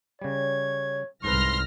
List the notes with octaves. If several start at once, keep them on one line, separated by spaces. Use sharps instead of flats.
C#3 G3 C#5 G#6
C2 G#2 A4 B4 C6 F6 A#6